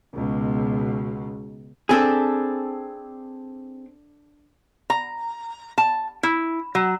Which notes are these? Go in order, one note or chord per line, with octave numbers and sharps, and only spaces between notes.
C#2 B2
C4 D4 G#4 A4 B5
A#5
A5
E4
F#3